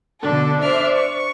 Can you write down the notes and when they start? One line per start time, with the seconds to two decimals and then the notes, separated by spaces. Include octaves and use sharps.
0.21 B2 D3 D4 A4
0.61 D4 C5 D5 E5 F6
0.94 C#6